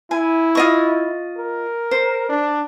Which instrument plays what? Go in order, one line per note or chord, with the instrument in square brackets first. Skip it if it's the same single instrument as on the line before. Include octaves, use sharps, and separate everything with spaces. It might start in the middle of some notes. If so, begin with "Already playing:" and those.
[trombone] E4 [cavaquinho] G#5
[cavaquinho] F4 D#5 C#6
[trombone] A#4
[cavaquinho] C5
[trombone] D4